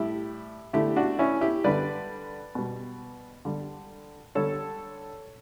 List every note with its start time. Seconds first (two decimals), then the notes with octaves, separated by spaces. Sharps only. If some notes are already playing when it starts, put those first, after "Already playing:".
Already playing: A2 G3 E4 G4
0.73 D3 A3 E4 G4
0.96 D4 F#4
1.19 C#4 E4
1.41 E4 G4
1.64 D3 G3 B4 D5
2.55 B2 G3
3.45 D3 G3
4.35 D3 G3 A4 C#5